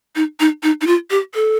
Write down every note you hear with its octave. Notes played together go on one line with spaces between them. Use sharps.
D#4
D#4
D#4
D#4
F4
G4
A4